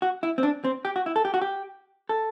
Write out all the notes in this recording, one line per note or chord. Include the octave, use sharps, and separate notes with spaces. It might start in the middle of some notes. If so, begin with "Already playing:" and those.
F#4
E4
C4
D4
C4
G4
F#4
E4
A4
G4
F#4
G4
A4